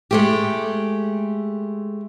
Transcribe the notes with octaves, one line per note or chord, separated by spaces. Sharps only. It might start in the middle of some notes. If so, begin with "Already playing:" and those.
G#3 A3 G4